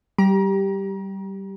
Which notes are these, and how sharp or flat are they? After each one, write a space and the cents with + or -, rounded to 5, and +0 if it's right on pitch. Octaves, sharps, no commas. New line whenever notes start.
G3 -20 G4 +0 A#5 +35